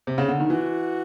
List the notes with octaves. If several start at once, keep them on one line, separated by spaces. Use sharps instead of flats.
C3
C#3
D3
D#3
E3 F#4